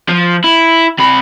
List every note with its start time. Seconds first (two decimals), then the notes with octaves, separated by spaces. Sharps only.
0.08 F3
0.44 E4
0.99 C3 B5